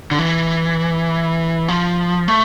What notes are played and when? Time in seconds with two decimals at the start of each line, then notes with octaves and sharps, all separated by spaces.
0.11 D3
0.19 E3
1.68 F3
2.28 A3